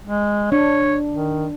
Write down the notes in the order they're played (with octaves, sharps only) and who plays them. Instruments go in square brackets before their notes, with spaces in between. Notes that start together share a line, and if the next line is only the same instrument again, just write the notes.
[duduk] G#3
[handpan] D4 [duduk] C#5
[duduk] D#3